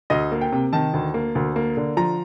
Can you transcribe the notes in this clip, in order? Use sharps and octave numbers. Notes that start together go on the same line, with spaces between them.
D2 D#5
A#3
G5
C3
D#3 A5
D2
A#3
D2
A#3
D3
F3 A#5